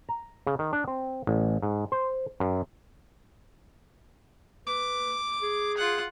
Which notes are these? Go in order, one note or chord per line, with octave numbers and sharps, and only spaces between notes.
A#5
C#3
D#3
D4
C4
A1
G#2
C5
F#2
B4 D6
G#4
F4 F#5